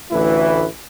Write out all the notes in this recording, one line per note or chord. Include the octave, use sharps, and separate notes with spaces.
A1 D2 E3 E4 B4